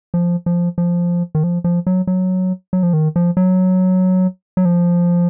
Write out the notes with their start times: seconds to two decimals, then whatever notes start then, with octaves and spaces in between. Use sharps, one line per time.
0.14 F3
0.46 F3
0.78 F3
1.35 D#3
1.43 F3
1.64 F3
1.87 F#3
2.07 F#3
2.73 F#3
2.83 F3
2.93 D#3
3.16 F3
3.37 F#3
4.57 F#3
4.65 F3